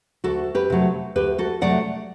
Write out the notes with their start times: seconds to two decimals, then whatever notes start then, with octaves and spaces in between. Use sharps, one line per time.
0.24 D2 F#4 A4
0.55 G4 B4
0.70 C3 F#3 A3
1.16 D2 G4 B4
1.38 F#4 A4
1.61 C3 F#3 A3 D5 F#5